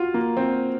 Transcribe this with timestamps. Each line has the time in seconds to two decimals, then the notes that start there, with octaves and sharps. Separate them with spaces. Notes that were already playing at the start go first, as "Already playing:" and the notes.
Already playing: F4 F#4
0.14 A#3
0.37 C4